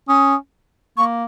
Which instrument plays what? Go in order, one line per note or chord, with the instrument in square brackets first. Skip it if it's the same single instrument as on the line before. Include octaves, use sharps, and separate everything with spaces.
[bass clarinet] C#4 [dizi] D#6
[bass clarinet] A#3 [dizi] C#6